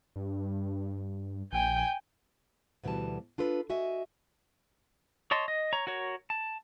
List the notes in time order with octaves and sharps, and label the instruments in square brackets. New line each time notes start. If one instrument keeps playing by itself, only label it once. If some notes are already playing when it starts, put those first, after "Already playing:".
[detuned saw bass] G2
[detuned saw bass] A#1 [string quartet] G5 G#5 G6
[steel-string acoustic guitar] D2 B2 E3 G3 A5
D4 F4 A4 B4
F#4 D#5 E5 G#5
[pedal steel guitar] C#5 D#5 A5 C6
D#5
C#5 A#5
F#4 A#4 C#5
A5